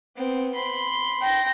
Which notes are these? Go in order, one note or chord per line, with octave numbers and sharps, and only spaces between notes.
B3 C4
B5 C6
G5 A#6